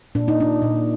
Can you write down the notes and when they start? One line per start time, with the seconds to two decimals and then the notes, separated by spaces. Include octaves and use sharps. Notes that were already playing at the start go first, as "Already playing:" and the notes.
0.15 A#2 D4
0.28 D#4
0.40 D4
0.62 A#2